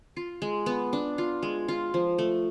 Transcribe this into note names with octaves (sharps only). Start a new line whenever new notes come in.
F4
G#3
B3
D4
F4
G#3
F4
F3
A3